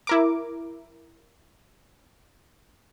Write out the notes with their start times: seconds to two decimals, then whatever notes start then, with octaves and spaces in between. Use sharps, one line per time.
0.07 E4 A#4 D6